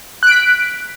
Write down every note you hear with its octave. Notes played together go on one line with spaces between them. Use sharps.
F#6 B6 D7